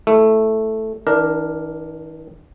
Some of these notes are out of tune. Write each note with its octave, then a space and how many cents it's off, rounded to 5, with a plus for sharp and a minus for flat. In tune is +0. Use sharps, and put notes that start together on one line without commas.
A3 +0 E4 +0
E3 -45 D4 +0 A#4 +0